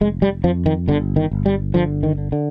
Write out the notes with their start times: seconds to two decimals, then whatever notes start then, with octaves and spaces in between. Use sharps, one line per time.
0.01 F1 G#3
0.22 G3
0.44 F2 F3
0.66 D#3
0.88 G1 D3
1.16 D#3
1.31 G1
1.46 G3
1.74 D3 F3
2.03 D#3
2.18 D3
2.32 D3